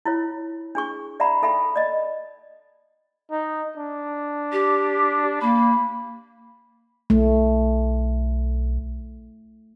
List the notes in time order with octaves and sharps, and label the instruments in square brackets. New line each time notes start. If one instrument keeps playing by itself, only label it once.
[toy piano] E4 F4 C#5
D4 G#4 C#6
D5 E5 F#5 A#5 B5
D#4 A4 E5 G5 B5
D5 D#5
[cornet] D#4
D4
[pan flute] G4
[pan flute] A#3 [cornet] B5
[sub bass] B1 [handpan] A3